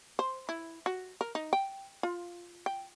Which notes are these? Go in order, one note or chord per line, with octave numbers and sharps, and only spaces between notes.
C5
E4
F#4
A#4
D#4
G5
F4
G5